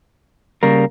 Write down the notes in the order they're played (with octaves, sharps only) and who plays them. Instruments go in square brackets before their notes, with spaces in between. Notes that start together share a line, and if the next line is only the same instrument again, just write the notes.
[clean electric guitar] C#3 G3 A#3 [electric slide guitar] A#4